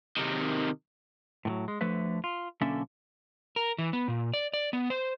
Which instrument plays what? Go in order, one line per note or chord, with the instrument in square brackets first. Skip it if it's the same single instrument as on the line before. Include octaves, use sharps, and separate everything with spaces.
[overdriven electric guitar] C3 D#3
[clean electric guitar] A2 D#3 F#3
G#3
D2 D3 F3 A3 B4 E5
F4
B1 D3 A#3 C#4 A4 E5
[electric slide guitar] A#4
E3
B3
A#2
D5
D5
B3
C5